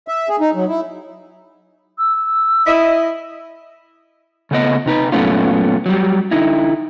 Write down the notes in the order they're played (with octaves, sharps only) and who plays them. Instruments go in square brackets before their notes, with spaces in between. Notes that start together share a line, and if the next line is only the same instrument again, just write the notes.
[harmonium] E5
G#4
D#4
F#3
E4
[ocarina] E6
[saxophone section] E4 D#5
[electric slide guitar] C#3 A3 B3 D#5
C3 D#4 B4
F#2 A#2 A3 B3 C#4 F4
F#3 G3
D3 D#4 E4